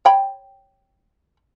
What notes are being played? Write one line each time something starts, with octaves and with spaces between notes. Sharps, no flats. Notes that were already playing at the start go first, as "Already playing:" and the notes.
C#5 G5 B5